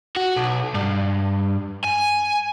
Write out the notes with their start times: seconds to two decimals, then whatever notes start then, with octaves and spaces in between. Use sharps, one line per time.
0.16 F#4
0.36 B1
0.74 G2
1.84 G#5